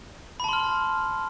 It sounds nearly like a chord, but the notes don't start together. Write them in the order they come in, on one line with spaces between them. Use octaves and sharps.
B5 A5 C6 F6